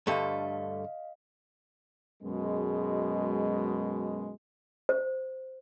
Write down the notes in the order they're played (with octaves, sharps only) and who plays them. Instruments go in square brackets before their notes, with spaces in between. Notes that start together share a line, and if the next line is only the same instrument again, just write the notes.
[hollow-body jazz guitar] G2 D3 A3 [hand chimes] D#5 F5
[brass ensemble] F#2 B2 G#3
[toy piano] C5